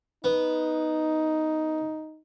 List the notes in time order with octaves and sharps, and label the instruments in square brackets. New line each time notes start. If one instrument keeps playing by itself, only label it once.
[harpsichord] B3 [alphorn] D#4